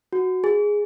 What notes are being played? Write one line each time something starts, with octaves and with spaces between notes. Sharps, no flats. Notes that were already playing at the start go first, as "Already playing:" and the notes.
F#4
G#4